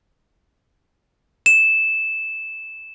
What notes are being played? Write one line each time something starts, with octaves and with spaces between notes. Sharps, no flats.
E7